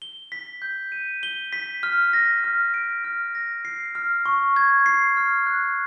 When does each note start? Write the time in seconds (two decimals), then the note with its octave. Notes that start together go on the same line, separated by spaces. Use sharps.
0.02 G7
0.32 B6
0.62 G6
0.92 D#7
1.23 G7
1.53 B6
1.83 F6
2.13 A#6
2.44 F6
2.74 D7
3.04 F6
3.35 A#6
3.65 C7
3.95 F6
4.26 C#6
4.56 G#6
4.86 C7
5.17 F6
5.46 F#6